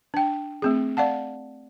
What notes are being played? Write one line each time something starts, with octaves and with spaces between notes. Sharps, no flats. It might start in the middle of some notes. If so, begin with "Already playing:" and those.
D4 G5
A3 C4 G#4
D5 F5 F#5 A5